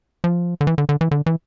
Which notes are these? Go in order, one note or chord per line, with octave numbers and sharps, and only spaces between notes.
F3
D3
E3
D3
D3
E3
D3
E3